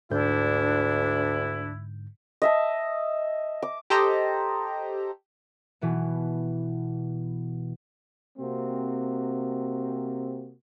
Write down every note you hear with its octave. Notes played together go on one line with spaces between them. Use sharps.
D2 G#2 D3 D4 E4 G6
D#5 E5 A5
D6
G4 A4 C5 D#5 A#5
B2 E3 B3
C3 A#3 C4 F#4